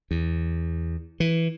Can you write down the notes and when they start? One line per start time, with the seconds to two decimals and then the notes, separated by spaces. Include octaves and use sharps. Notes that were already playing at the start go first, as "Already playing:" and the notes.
0.11 E2
1.20 E3